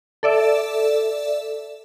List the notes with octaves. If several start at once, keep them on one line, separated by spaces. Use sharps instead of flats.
A4 D5 E5